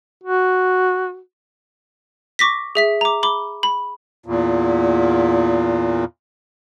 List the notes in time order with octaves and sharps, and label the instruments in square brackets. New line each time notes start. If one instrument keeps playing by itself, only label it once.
[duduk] F#4
[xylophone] C#6 D6 A#6 B6
G#4 E5 B6
A#5 D6
B5 D6 G7
B5
[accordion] E2 A#2